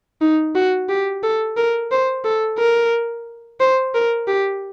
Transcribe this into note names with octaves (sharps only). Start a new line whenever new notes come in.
D#4
F#4
G4
A4
A#4
C5
A4
A#4
C5
A#4
G4